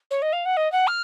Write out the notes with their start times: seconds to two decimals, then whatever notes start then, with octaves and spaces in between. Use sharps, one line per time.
0.10 C#5
0.22 D#5
0.32 F5
0.45 F#5
0.57 D#5
0.72 F#5
0.87 F6